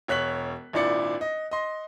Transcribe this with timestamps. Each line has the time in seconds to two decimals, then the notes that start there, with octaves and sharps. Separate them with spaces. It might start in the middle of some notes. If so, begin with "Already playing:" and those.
0.08 E1 C#5 F#6 B6 F#7
0.73 G#1 A#2 D4 E4 D5 C#7
1.21 D#5
1.51 D#5 C6